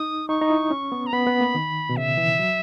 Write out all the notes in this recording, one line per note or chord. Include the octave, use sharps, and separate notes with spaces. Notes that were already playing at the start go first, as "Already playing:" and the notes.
Already playing: D#4 D#6
D#4 C#6
D#4
E4
C#4
B3
A#5
B3 B5
B3
A#3
D#3
B2
C#3 E5
E3
F#3